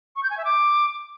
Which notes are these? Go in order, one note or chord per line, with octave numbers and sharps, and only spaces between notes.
C#6
G6
G#5
E5
D6